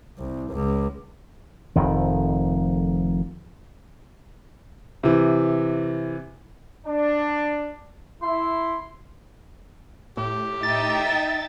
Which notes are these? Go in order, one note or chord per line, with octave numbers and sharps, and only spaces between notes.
C2
C#2
F1 F2 D#3
C3 E3
D4
E4 C6
A2 G4
D#4 E5 G5 A6